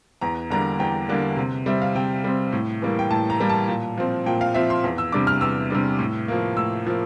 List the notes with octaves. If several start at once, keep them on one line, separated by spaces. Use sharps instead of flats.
E2 A#5
D3 G3 A#3 D4 A#5
E2 G5
D3 G3 A#3 D4
C3
G3 C4 E5
F5
C3 G5
G3 C4
A2
E3 G3 A#3
G5
A2 A5
A#5
E3 G3 A#3
A5
A#2
F3 C4
A#2 G5
F5
F3 C4 E5
C6
E2
E6
C3 G3 D4 D6
F6
E2 E6
C3 G3 D4
A2
F3 A#3
A2 E6
F3 A#3